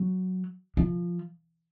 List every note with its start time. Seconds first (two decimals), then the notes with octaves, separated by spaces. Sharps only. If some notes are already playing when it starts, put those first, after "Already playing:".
Already playing: F#3
0.77 F3